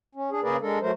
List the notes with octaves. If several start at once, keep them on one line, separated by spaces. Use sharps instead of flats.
C#4
D4 G#4
C#3 A#3 G#4 A#4 B4 D5
G#3 D4 A4 A#4
F#3 A3 A#4 C5